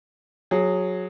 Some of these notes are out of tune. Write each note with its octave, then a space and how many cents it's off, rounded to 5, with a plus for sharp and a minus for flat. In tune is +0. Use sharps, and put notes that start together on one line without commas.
F#3 -15 G#4 +0